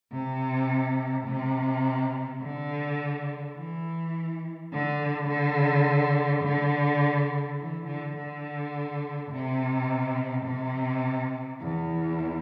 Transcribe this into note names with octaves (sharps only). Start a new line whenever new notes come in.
C3
C3
D3
E3
D3
D3
D3
E3
D3
D3
C3
C3
E2